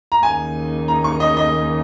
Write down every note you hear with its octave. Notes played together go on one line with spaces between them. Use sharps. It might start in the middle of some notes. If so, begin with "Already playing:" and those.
A#5
D#2 C#3 A#3 D#4 G#5
A#5
C#6
D#5
D#5